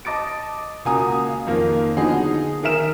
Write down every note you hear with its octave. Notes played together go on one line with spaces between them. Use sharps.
D#5 A5 D6 A6 D7
C#2 A#3 F#4 G#5 A#5 D#6
F5
F2 D#3 A#3
D3 F3 F#3 B3 D#4 G#4
D#3 G#4 A#4 E5 F6 E7